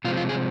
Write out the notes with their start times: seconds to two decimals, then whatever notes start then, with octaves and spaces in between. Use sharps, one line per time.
0.04 C3 F3 G#3 C4 F4
0.17 F4
0.29 G#4